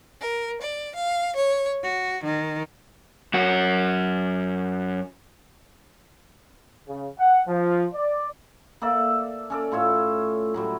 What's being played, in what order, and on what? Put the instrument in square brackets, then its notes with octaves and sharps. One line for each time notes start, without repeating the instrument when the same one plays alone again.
[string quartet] A#4
D5
F5
C#5
F#4
D#3
[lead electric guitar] F#2 F#4
[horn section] C#3
F#5
F3
D5
[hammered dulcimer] A#3 A4 D5 E5
C#4 A4 D5
A2 F4 C#5 E5
A2 F#3 G3